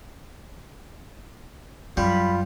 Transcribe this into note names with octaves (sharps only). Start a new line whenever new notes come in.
F#2 G3 F4 B5